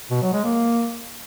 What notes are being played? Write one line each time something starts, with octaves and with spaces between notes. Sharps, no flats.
B2
F#3
G#3
A#3